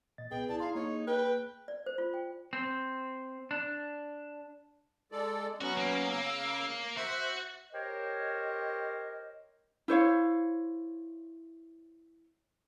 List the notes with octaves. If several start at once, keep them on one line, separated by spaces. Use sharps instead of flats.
A#2 D#5 A6
C2 B3 G#4 B4 G5
E4 D5 A5
E4 F5 A#5 C6
A#3 D#4 G#4 C#5
B4 G5
D5
C5
F4
G5
C4
D4
G#3 A4 D5
F#3 B3 C#4 F#4
A#3
C#3 E6
F#4 C5 E5
G4 A#4 C5 C#5 D#5
E4 C5 C#5 F5